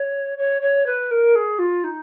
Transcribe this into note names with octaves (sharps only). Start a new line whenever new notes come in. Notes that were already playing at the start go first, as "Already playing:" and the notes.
Already playing: C#5
C#5
C#5
B4
A#4
G#4
F4
D#4